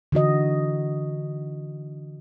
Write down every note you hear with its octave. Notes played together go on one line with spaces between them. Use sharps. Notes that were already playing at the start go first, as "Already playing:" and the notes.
D3 E3 F#4 D#5